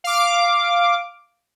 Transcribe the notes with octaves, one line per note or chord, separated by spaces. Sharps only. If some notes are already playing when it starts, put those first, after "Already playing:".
F5 D6